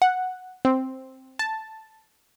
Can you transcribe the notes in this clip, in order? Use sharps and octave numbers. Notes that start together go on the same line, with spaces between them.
F#5
C4
A5